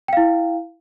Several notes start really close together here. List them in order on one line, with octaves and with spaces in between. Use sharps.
G5 F5 E4